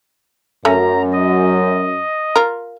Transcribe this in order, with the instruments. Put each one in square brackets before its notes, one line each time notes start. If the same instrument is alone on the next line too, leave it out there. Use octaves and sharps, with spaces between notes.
[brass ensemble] F#2 [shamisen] A3 C#4 [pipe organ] A#5
[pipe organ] D#5
[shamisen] F4 A#4